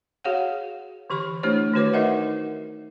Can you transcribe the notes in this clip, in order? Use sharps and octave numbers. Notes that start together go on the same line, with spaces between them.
F#4 G#4 C#5 F5 F#5
D3 E3 G4 B5 C#6
A3 D4 E4 G4 C5 C#5
D#3 A3 F#4 B4 C#5 D6
D#4 F#4 A#4 D#5 E5 F#5